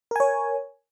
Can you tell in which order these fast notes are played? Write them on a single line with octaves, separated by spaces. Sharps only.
A#4 G#5 C#5